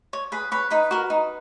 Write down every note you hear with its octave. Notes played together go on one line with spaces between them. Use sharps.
C#5
G#4 B4 B5
B4 C#5 B5
D#4 B4 B5
F#4 A#4
D#4